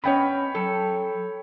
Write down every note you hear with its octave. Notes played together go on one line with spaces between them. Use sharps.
G2 B3 C#4 C#5 D#5 G5 B5
F#3 A4